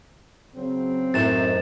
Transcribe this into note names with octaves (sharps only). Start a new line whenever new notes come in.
C#3 F#3 C4
F#2 A2 D#4 C5 A6 E7